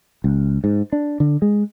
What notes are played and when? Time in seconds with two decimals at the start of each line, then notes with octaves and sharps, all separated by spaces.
0.24 C#2
0.64 G#2
0.92 D4
1.20 D3
1.42 G#3